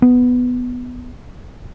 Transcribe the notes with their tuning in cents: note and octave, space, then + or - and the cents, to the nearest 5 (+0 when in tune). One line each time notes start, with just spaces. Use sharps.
B3 +5